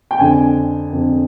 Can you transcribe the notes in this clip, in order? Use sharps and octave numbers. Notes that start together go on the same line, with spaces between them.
G5
F2 D3 G#5
F2 D3